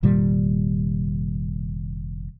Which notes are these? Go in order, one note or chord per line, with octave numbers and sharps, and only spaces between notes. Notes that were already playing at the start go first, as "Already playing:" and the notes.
F1 A#2 D#3 G3